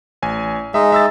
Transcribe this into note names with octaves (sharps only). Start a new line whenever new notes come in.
A1 G#5
G#3 D#4 E5
E5 E6 A6